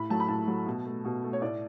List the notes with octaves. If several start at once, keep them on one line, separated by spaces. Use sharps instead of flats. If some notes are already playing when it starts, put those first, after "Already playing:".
Already playing: A2 B5
F#3 A3 A5
B5
A2 A5
F#3 A3
B2
A3
B2
A3
C#5
A2 D5